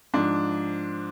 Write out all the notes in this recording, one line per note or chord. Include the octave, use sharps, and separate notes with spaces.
G#2 F3 D4